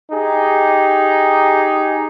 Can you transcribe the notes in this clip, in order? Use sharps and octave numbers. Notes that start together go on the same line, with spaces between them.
D#4 G4 G#4